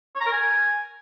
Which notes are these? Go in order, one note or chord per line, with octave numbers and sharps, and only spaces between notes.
C#5
A#5
A#4
G#5